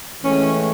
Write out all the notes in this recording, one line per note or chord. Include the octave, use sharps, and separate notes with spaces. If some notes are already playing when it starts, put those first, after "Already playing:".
A2 E3 G#3 C#4